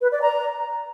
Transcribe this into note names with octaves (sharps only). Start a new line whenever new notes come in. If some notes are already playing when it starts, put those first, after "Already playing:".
B4
D5
A#5